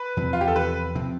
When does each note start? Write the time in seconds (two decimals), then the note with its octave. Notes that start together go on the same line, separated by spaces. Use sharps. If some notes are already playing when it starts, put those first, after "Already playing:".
Already playing: B4
0.17 E2 C3 F3 C4
0.33 F4
0.41 G4
0.48 A4
0.56 B4
0.95 C3 F3 C4